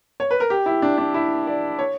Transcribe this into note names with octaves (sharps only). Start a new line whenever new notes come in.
C#5
B4
A#4
G4
E4
D4
D4
E4
D5
C#5